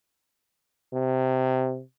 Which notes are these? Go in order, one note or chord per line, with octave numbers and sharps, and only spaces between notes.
C3